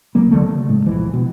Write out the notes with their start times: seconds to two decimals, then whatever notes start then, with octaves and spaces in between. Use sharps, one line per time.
0.15 C#2 C#3 F#3 A#3
0.31 D3 F3 F#3 A3
0.47 C#3
0.69 A2 G#3
0.86 E1 B1 E3 F3
1.13 B2